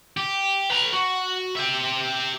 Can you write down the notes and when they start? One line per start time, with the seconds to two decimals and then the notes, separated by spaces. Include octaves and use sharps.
0.17 G4
0.70 B4 A#5
0.93 F#4
1.57 G4 E5